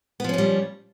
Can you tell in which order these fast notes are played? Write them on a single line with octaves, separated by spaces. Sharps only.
B3 F3 C#4 A#2 G3